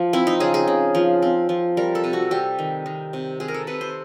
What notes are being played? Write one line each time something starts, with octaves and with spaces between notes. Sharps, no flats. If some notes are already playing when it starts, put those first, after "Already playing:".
Already playing: F3
C4 E4
D#4
C#3 G#4
G#4
C#3
F3
C4
F3
G3 A#4
A4
C3
F#4
G3 G4
D#3
D#3
C3
C3 G#4
A#4
A4
C3 B4
C5